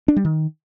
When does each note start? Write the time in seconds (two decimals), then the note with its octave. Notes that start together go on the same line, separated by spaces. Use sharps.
0.08 D4
0.16 G3
0.25 D#3